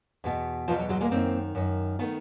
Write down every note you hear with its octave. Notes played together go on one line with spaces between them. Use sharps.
E2 B2
E2 B2 F3
F#3
F#3 G#3
G#3 A#3
F#2 D#3 A#3 C4
F#2 D#3
D#3 A3 B3